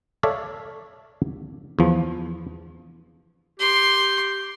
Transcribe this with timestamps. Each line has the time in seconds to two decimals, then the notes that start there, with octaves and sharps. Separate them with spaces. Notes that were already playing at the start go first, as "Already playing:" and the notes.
0.23 A4 C#5 D5 E5 F5
1.79 E2 F3
3.60 G4 C6